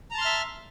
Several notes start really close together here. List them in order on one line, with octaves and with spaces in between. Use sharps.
A#5 A5 C6 F6 E5